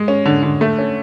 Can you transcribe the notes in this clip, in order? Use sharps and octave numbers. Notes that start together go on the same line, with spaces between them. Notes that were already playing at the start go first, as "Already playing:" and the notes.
Already playing: G#3
C#4
D3
D3
A3
C#4